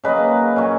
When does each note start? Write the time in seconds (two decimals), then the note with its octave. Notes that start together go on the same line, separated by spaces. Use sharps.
0.04 C#3 F#3 A#3 B4 D#5
0.56 A#2 F#3 C#4